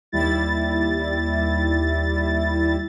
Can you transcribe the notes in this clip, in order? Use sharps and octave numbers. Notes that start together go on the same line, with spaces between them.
D#2 G3 E4 A6